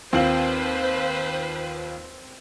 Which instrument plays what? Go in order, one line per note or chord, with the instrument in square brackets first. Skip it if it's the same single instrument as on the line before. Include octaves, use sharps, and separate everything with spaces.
[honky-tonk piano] D#2 F4 F#7 [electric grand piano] C4 [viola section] B4 C5